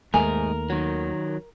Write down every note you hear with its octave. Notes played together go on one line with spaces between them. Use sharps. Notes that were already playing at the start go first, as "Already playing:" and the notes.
D#2 G#2 A3 G#4 A#4 G#5
D#3 F#3